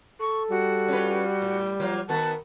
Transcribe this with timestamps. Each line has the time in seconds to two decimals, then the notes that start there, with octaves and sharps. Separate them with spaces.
0.20 A4 C#6
0.50 G3 F#4
0.88 C#4 F4 B4
1.42 A2
1.80 F3 F#3 A#3 F4
2.09 D#3 B3 F#4 A#4 A5